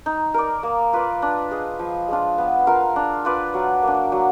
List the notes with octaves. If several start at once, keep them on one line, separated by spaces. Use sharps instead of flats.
D#4
A#4 D5
A#3
F4 B4 D5
D4
G#4 D#5
F3
G#3 D4 F4
B3
F4 A#4 F5
D4
F4 B4 D5
F#3
A#3 D4
F#3